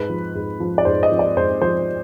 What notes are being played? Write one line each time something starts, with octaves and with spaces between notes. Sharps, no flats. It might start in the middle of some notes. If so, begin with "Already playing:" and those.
Already playing: G#2 B4
F3
G#2
F3
D5
G#2 C5
D#5
F3
D5
G#2 C5
F3 C5